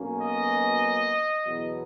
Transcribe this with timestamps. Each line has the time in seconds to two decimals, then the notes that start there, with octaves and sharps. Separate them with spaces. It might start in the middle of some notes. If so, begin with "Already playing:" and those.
Already playing: B1 B2 A#3 C#4
0.21 D#5
1.46 E2 B2 F#3 B3